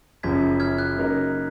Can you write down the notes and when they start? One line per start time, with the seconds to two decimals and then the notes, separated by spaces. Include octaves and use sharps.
0.23 F#1 F#2 C#3 F3 G#6 B6
0.60 F6 G#6
0.78 F#6
0.97 C#3 F#3 A#3 D#4 A#4